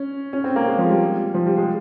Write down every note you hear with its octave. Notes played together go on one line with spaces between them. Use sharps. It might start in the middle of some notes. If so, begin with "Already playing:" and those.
Already playing: C#4
C#4
C4
A#3
G#3
F3
G3
F3
G3
G#3